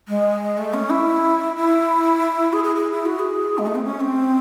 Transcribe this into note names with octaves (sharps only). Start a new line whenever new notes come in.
G#3
A3
C#4
E4
E4
G#4
G#4
G#4
E4
F#4
G#4
G#3
A3
C4
C#4
C4